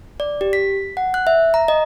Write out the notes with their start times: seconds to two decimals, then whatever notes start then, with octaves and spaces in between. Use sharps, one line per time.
0.20 D5
0.41 G4
0.53 B6
0.97 F#5
1.14 F#6
1.27 E5
1.54 A#5
1.68 D#5